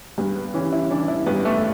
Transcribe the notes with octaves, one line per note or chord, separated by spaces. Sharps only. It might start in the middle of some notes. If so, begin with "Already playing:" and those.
G2 B3
B3
E3 C#4
E4
E3 D4
E4
G2 B3
A3